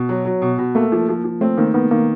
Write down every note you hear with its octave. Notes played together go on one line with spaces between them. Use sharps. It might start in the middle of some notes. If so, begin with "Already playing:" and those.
Already playing: B2 B3
F#3
F#3
B2
B2
A3 A#3
F3
F3
F3
A3 C4
D#3 A#3
D#3 B3
D#3 A#3